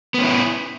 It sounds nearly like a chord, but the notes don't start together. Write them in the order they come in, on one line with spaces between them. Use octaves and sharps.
B3 C#4 E4